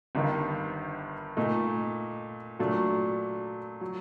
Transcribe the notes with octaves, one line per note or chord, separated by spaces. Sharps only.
G1 G2 D#3
A#2 A3 D#4
A#2 F#3 A3 D4
F#3